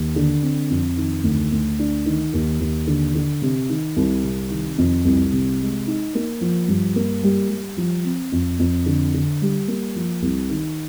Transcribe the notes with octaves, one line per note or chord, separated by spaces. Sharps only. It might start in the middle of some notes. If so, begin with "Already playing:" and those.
Already playing: D#2
D3
C4
F2
D#3
D2
D2
D4
D#3
D#2
D#2
D3
D3
C3
D#3
C2
C3
D#3
F2
C2
C3
G#3
D#4
A#3
F3
G2
A#3
G3
G3
F3
C4
F2
F2
D3
D3
G3
A#3
F3
C2
D#3